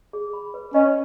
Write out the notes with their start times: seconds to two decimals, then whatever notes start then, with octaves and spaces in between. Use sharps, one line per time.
0.13 G#4
0.33 B5
0.54 B4
0.73 C#4 D#5